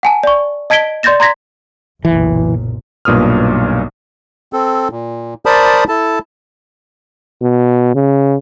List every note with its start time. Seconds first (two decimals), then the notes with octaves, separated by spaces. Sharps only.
0.03 F#5 G#5 A5
0.23 D5 C#6
0.70 D#5 A5 G#6 B6 D7 G7
1.03 D5 C6 G6 A6 A#6 E7
1.20 A#5 C6 G#6 A#6 B6
2.05 F#1 B1 A#2 E3
3.05 B1 G2 A#2 B4 D#6 F6
4.53 C4 A4
4.91 A#2
5.46 A#4 C5 D5 A5 B5 D#6
5.89 E4 A4 A5
7.42 B2
7.95 C#3